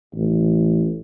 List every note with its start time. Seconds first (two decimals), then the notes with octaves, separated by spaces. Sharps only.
0.15 A1